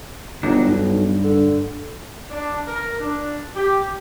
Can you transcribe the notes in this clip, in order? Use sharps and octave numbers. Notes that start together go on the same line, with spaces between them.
G1 F#3 D4 D#4
B1 G2
D3
D4
A#4
D4
G4